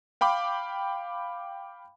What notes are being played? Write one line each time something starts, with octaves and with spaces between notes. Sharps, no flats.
F5 G5 B5 D6